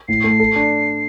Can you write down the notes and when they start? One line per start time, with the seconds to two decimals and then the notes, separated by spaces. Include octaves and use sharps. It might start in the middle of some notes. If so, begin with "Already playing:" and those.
0.08 A2 C7
0.24 A3
0.40 A4
0.56 D4